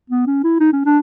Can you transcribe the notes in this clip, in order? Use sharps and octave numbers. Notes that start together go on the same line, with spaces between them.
B3
C#4
E4
D#4
C#4
D4